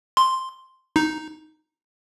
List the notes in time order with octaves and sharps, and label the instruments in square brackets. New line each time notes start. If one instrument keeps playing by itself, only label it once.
[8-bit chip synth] C6
D#4